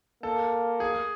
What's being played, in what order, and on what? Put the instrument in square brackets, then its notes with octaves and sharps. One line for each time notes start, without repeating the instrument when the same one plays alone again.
[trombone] A#3 [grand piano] A4
[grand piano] G#4